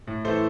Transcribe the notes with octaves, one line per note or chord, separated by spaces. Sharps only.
A2
E3 A3 A4 C5